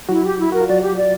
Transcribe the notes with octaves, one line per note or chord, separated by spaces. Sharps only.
F#3 E4 F#4
G4
E4
F#4 A#4
F4
F#3 F#4 D5
G4
D5